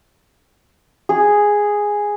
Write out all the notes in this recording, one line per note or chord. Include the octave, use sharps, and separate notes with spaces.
G#4